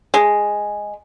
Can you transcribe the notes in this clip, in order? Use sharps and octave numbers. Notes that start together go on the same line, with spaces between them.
G#3